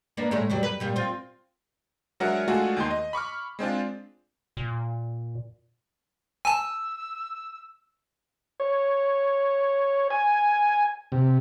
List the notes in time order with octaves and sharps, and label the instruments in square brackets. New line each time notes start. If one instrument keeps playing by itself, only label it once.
[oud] A#3 B3 D4
A2 G#3 A3
E2 F#3 G3
B4
A#2 G3 F4
C4 F4
[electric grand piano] F#3 G#3 D4 A#4 E5 F#5
G#3 A3 D4 F4 F#4 G#4
D#2 D#3 C6
D#5
B5 C#6 D6 F6
G#3 C4 D4 F4
[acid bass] A#2
[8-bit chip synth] G#5 A5 [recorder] E6
[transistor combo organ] C#5
G#5
C3